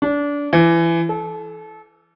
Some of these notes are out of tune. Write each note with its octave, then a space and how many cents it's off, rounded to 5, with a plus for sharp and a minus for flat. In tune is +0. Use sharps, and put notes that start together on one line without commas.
D4 -25
E3 +25
A4 -25